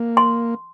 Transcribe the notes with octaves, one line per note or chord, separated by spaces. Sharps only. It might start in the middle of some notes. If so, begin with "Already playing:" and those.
Already playing: A#3
C6